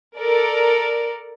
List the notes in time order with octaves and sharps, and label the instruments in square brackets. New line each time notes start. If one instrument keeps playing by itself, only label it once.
[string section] A4 A#4 D5